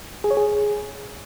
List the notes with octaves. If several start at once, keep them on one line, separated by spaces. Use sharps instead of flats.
G#4
C#5
G#4